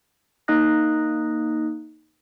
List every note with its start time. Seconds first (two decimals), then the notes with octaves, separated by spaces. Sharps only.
0.48 A#3 D#4 D#5 D#6 F#6 A#6